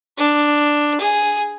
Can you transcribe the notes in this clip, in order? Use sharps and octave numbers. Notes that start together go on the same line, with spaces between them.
D4
G#4